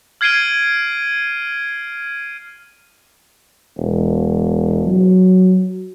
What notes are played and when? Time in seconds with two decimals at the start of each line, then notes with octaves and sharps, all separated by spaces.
0.21 F6 G#6 C7 D7 D#7 G7
3.77 E1
4.86 F#3